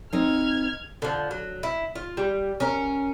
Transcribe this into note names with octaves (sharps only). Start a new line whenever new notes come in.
C4 D#4 F6 G#6
D3 F3
F#3
E4
F4
G3
C#4 A#4